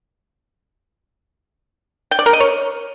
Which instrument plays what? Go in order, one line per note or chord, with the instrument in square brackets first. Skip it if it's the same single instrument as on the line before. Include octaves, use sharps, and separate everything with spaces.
[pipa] G5
D5
A#4
D#5
C#5